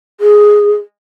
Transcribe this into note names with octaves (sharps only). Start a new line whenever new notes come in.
G#4